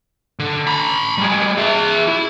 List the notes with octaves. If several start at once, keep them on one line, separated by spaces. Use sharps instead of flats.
D3
A#5 B5
G3 G#3
G#4 E5
E4